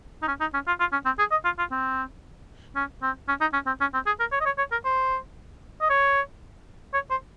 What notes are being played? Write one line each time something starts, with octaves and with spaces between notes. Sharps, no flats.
D#4
C#4
D#4
C#4
F4
F4
C#4
C4
G#4
D#5
F4
F4
C4
C#4
C4
C#4
D#4
C#4
C4
C#4
C4
G#4
A#4
C#5
D#5
C#5
C#5
A#4
C5
D#5
C#5
C#5
C5